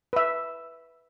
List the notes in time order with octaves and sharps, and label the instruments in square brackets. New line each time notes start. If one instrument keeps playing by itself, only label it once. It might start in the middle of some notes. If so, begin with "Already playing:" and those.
[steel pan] B4 E5